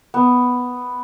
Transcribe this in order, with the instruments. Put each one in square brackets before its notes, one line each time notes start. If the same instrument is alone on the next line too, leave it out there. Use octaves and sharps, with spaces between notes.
[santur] B3